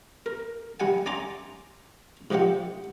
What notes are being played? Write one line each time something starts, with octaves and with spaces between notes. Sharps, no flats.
A#4
G3 F#5 G#5
D5 G#5 A#5 C6 D6
G#2 F3 D4 G4 F#5